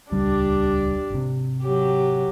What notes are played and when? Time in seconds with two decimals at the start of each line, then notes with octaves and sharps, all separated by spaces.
0.12 D#1 C#2 G3 D4 G4
1.10 G#1 C3
1.62 F#3 G4